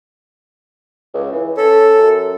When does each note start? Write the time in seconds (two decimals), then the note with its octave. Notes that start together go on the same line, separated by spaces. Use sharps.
1.14 C#2
1.33 E3
1.57 C#4 A4
1.97 F#2